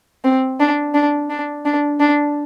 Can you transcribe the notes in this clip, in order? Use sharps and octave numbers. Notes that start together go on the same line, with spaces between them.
C4
D4
D4
D4
D4
D4